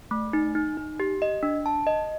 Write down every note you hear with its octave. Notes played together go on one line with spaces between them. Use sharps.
A3
D#4
D#4
D#4
G4
D#5
D4
A5
D#5